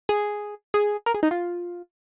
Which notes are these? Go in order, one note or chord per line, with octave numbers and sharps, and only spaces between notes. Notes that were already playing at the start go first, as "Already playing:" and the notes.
G#4
G#4
A#4
G#4
D#4
F4